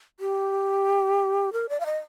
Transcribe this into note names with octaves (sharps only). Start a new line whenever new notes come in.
G4
A#4
D5
F5
D#5